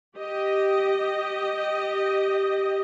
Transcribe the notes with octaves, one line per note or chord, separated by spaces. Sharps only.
G4 D#5